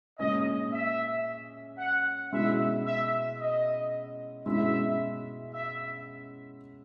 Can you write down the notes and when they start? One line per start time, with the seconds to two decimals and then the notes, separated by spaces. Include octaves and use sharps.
0.19 A#2 G#3 C#4 D#5
0.72 E5
1.78 F#5
2.32 B2 G#3 C#4 E4 E5
2.86 E5
3.39 D#5
4.46 B2 G#3 C#4 E4 E5
5.53 E5